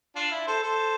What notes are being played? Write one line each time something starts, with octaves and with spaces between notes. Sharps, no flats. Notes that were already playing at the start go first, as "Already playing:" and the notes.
D4 F4
E4
A4 C5
A4 C5